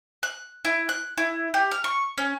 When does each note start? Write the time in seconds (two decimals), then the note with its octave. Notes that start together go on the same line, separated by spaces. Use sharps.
0.23 F#6
0.65 E4
0.89 F#6
1.18 E4
1.54 G4
1.71 F6
1.84 C#6
2.18 C#4